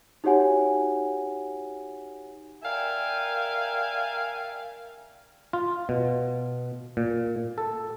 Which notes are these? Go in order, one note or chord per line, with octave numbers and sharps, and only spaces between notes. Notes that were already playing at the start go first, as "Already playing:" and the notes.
D#4 F#4 G4 C#5 F#5 G#5
A#4 D5 E5 F5 G5 G#5
F4
B2
A#2
A4